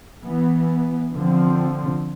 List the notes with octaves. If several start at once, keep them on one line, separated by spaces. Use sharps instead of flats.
E3 B3
D3 F3 C4